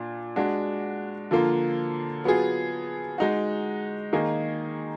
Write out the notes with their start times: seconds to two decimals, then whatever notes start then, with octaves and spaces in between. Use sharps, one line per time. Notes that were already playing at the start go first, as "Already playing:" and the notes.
Already playing: A#2 D4
0.36 G#3 D4 F#4
1.31 D3 F3 A#3 F4
2.24 F#3 B3 F4 G#4
3.18 G#3 D#4 F#4
4.13 D#3 A#3 D#4 G#4